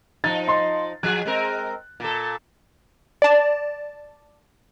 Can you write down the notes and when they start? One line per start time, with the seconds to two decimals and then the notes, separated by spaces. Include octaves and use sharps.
0.24 F3 D#4 A6
0.48 D#5 C6
1.03 F3 G#4 F#6
1.25 G#3 C4 A#4
2.00 A#2 A4
3.22 D5 A5